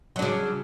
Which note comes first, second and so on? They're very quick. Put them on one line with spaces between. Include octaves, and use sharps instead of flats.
F#3 D4 C#3